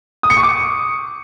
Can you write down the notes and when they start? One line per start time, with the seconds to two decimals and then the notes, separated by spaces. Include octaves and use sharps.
0.23 D#6
0.30 C#7
0.37 C#6
0.43 D6